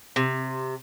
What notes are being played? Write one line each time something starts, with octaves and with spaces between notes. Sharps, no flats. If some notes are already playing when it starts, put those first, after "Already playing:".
C3